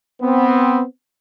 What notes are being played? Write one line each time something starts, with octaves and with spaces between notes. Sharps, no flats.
B3 C4